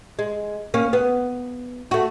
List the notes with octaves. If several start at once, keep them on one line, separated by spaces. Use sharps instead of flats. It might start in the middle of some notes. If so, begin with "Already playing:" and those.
G#3
A#3 C#4
B3
A3 F#4